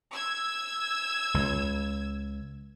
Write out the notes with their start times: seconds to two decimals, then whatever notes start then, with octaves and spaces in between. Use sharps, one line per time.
0.12 E6 G#6
1.34 C#2